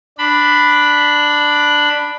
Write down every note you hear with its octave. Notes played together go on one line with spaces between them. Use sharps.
D4 B5